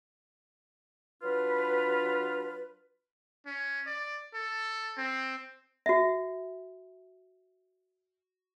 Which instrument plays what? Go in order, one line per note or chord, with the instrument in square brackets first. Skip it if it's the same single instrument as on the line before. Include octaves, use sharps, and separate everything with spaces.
[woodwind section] F#3 D4 F4 B4
[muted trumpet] C#4
D5
A4
C4
[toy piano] F#4 E5